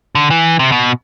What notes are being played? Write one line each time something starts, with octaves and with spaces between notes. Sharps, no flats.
D3
E3
C3
B2